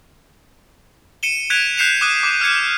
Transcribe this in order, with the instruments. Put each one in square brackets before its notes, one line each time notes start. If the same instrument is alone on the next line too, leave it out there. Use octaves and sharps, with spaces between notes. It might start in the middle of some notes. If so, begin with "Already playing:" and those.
[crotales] C#7 D#7 E7 G7
F#6 G#6 B6 D7 F7
F#6 G6 C7 C#7 E7 F7
D6 D#6 F#6 D#7
D6
F6 G6 G#6 C#7